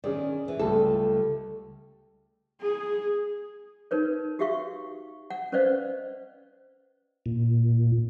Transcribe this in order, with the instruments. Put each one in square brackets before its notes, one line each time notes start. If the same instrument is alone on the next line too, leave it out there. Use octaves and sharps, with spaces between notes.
[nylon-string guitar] D#3 [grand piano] C#4 G#4 D5
[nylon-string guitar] E3
[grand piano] C#2 G3 A3 [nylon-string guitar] A4
[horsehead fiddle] G#4
[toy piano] D#4 A#4 B4 C#5
F#4 G4 E5 F5 C#6
F#5
C#4 B4 C5 D5 D#5 F5
[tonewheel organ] A#2